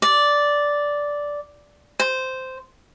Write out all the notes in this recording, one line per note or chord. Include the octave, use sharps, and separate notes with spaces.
D5
C5